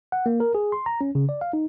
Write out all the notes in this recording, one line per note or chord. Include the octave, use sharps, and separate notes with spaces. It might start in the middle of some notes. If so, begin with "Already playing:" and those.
F#5
A#3
A#4
G#4
C6
A#5
C#4
C#3
D5
F5
D#4